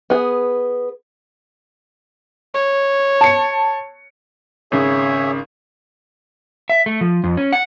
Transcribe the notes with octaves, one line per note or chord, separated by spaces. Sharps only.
B3 G#4
C#5
A5 C#7
G#1 C#3 G#4 C#5 E5
E5
A3
F3
F2
C#4
F#5